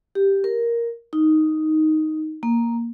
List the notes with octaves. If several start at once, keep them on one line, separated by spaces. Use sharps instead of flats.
G4
A#4
D#4
A#3